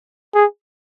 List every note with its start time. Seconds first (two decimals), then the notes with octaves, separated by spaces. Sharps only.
0.34 G#4